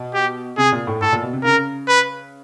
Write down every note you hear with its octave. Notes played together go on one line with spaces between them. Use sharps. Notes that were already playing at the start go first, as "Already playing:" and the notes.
Already playing: B2
G4
C3 G#4
A#2
A2
A2 A4
A#2
B2
C3
C#3 A#4
B4